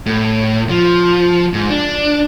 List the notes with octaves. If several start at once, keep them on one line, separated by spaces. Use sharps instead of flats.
A2
F3
G#2
D4